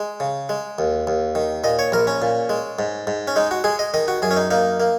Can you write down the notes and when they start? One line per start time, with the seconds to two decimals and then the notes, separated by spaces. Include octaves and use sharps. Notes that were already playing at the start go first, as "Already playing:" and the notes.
Already playing: G#3
0.20 C#3
0.49 G#3
0.79 D#2
1.07 D#2
1.35 D#3
1.64 A#2 D#5
1.79 C#5
1.92 A#1 A#4
2.07 C#4
2.22 A#2
2.49 G#3
2.79 G#2
3.07 G#2
3.28 C#4
3.36 G#3 D#4
3.51 F#4
3.64 G#3 G#4
3.79 D#5
3.94 D#3 D#5
4.08 F#4
4.22 F#2 G#4
4.31 C#4
4.37 D#4
4.51 A#3 D#4
4.80 A#3